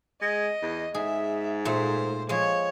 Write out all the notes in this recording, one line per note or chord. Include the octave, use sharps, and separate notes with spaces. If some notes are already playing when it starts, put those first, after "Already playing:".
G#3 D#5
E2
G#2 G#4 E5
A#2 A3 C5
F3 G#3 C#5